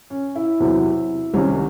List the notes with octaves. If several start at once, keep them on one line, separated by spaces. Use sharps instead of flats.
C#4
E4
E2 C3 F#3
C2 C3 D#3 C#4